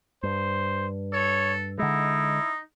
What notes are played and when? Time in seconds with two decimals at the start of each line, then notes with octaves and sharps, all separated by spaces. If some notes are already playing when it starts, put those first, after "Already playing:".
0.23 G2 C5
1.13 A4 C#5
1.79 D3 G#3 D#4 E4